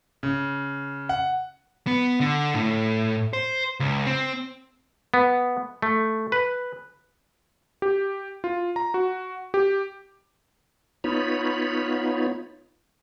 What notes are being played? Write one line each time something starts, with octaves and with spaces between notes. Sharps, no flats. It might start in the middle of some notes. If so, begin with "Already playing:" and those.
C#3
F#5
B3
D3
A2
C5
C#2
C4
B3
A3
B4
G4
F4
A#5
F#4
G4
B3 D#4 F4 C#5 B5